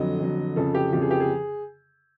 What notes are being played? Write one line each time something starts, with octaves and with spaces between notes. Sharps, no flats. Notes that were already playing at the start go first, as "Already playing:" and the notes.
Already playing: F2 D3 F#3 D#5
F2 D3 F#3
F2 C#3 F3 A4
G4
F2 C#3 F3 G4
G#4
G4
G#4